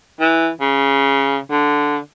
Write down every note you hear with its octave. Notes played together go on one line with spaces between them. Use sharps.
E3
C#3
D3